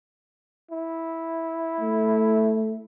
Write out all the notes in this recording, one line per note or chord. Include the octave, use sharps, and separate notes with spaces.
E4
A3